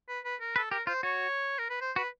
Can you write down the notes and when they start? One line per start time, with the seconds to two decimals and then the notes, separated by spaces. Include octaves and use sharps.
0.09 B4
0.24 B4
0.41 A#4
0.56 A4 B4
0.71 G4 A#4
0.87 F4 C5
1.03 F#4 C#5
1.58 A#4
1.70 B4
1.81 C5
1.96 F#4 B4